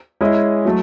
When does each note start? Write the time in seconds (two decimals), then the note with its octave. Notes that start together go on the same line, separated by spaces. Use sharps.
0.21 G#3 C#4 E4 G#4 D#5
0.65 F#3 A3